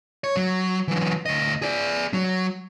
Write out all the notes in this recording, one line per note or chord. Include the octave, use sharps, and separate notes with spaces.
C#5
F#3
E3 F#3
D2 D#5
G#4 D5
F#3